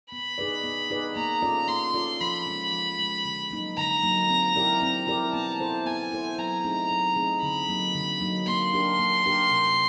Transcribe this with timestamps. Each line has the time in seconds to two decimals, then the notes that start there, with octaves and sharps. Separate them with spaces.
0.12 B3 B5
0.38 D#4 G#4 B4 D5
0.64 B3
0.91 D#4 G#4 B4 D5
1.16 A#3 A#5
1.42 C#4 F4 A4 D5
1.68 A#3 C6
1.94 C#4 F4 A4 D5
2.21 F3 B5
2.47 G#3 C#4
2.72 F3
2.99 G#3 C#4
3.25 D3
3.50 F#3 A#3 D#4
3.77 D3 A#5
4.03 F#3 A#3 D#4
4.29 C4
4.56 E4 G4 A#4 D5
4.82 C4
5.07 E4 G4 A#4 D5
5.34 B3 A5
5.60 E4 A4 C5
5.86 B3 G#5
6.12 E4 A4 C5
6.38 F#3 A#5
6.64 A3 C4 D#4 G#4
6.91 F#3
7.16 A3 C4 D#4 G#4
7.43 D3 B5
7.69 F#3 A#3 D#4
7.95 D3
8.21 F#3 A#3 D#4
8.47 A#3 C6
8.73 D4 G4 A#4
8.99 A#3
9.25 D4 G4 A#4
9.51 C3